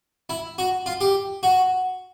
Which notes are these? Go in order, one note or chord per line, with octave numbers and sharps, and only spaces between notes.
E4
F#4
F4
G4
F#4